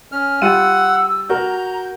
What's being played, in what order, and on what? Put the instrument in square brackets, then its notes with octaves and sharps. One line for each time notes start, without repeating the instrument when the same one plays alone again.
[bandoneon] C#4 F6
[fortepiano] G3 F4 [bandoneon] F#5 [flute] E6 [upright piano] D#7
[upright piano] F#4 A#4 [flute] A#5 [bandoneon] G6